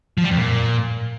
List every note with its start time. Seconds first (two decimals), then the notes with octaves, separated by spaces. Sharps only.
0.18 F3
0.24 G3
0.31 F2
0.37 A#2